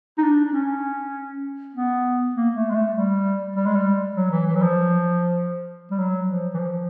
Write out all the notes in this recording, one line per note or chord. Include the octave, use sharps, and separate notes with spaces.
D#4
D4
D4
C#4
B3
A#3
A3
G#3
A3
G3
G3
G#3
G3
F#3
E3
E3
F#3
F3
G3
F#3
F3
E3
F3